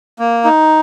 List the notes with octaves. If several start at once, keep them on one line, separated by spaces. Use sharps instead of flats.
A#3
D#4